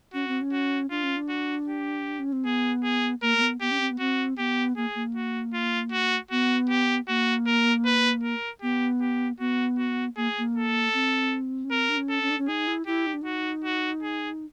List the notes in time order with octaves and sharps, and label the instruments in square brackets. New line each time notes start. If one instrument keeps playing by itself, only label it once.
[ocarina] C#4 [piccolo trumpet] F#4
[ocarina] C4
C#4
[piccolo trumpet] F#4
[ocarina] D4 [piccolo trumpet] F4
[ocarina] C#4
D4
[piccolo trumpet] F#4
G4
[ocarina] C#4
C4
[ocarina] B3 [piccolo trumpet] G#4
[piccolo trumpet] G#4
[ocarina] A#3 [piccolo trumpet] A#4
[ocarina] A#3
B3
[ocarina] B3 [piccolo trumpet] G4
[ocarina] C#4
C4
B3
[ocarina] C4 [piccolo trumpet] F#4
[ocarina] B3 [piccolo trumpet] G4
[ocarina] A#3 [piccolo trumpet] G#4
[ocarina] A#3
[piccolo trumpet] F#4
F4
F#4
[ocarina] B3 [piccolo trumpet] F#4
[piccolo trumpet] G4
[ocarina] A#3 [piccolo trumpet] F#4
[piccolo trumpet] A#4
B4
A#4
[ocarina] B3 [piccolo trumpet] G4
[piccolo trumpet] G4
[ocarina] B3 [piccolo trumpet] F#4
[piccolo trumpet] F#4
[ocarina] A#3 [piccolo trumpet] G#4
[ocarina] A#3
[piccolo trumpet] A4
[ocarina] C4
C#4
[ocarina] C4 [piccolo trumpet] A#4
[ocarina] D4
C#4
[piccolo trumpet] A4
[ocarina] C#4
D4
C#4
[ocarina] D#4 [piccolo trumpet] G#4
[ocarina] E4
[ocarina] E4 [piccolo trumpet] G4
[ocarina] D#4
D4
[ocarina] D#4 [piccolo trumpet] F#4
[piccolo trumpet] F#4
G#4